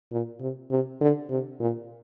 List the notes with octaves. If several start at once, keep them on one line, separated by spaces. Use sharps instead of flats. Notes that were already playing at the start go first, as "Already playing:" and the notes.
A#2
C3
C3
D3
C3
A#2